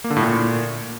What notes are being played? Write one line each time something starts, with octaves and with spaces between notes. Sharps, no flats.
A#3
D3
A2
A#2